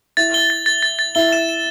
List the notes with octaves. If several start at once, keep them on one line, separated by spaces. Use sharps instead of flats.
E4 A6
G7
A6
A6
A6
A6
E4 G7
E7
E7